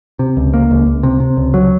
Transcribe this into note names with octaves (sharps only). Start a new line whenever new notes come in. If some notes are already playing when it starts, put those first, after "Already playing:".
C3
C#2
A#3
C#2
C#2
C3
C3
C#2
F#3